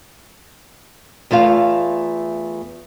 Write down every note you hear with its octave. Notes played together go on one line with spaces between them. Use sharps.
E2 A3 F4 F5